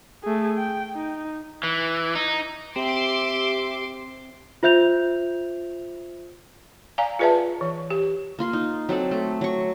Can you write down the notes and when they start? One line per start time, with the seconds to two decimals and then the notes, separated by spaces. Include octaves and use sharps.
0.24 A3 G#4
0.58 G5
0.95 D#4
1.63 E3
2.15 D#4
2.76 C4 G4 E5 C6 D6
4.63 F4 C5 E5 G6 F7
6.98 D5 F5 G#5 A#5
7.19 F4 G#4 B4 D5 E5 A5
7.61 E3
7.90 G4
8.39 A#3 F4 C6
8.53 D#4
8.89 F#3 C4 A4 D5
9.11 A3
9.41 F#3 C#6